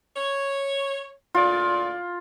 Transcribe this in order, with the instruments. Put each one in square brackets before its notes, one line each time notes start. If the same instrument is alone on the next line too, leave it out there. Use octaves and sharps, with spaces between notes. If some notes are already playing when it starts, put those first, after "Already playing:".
[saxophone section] C#5
[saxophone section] D2 A#2 D5 [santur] F4